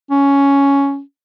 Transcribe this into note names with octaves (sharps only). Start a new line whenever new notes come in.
C#4